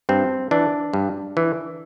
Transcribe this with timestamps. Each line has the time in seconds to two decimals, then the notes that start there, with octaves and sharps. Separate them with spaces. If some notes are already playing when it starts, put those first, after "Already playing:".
0.09 G2 C4
0.51 E3 D4
0.93 G2
1.37 E3